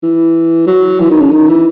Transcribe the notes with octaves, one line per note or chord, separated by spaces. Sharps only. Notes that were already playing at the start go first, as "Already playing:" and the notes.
E3
F#3
E3
D#3
C#3
D#3
E3